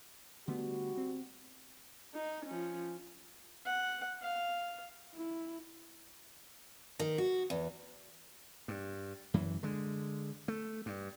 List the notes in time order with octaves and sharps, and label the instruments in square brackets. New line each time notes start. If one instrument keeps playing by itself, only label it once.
[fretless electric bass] D3 A3 B3 [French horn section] G3 F#4
[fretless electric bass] C4
[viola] D#4
F3 C#4
[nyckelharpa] F#5
F5
[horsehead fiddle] E4
[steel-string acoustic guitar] D#3
F#4
E2
[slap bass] G2
F#2 E3
D3 G#3
A3
G2